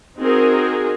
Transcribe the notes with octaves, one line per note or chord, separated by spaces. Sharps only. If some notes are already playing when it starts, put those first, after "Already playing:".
C4 D#4 F#4 G#4 A#4